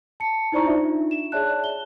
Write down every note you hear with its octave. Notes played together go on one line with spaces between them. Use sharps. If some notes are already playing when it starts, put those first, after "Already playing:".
A5 C#7
D#4 E4 C5 D5 A#5 C#6
D4 D#4 F4 E5
E7
G#4 C#5 D5 E5 A5 F#6
G7